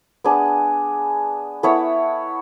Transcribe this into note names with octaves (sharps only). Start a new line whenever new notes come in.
B3 D4 G#4
B3 E4 A4 C#5